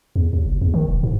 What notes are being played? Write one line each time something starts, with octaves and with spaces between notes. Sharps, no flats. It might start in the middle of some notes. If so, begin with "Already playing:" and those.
E2
D#2
F#1
E2
D#3
E1
G#2